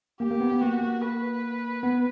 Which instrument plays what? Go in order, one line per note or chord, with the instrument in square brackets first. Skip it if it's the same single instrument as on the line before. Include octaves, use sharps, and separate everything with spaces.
[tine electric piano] A#3 [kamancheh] G4
[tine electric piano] A#3
B3
B3
[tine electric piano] A#3 [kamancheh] F#4
[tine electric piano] A#3
[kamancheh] B4
[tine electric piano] B3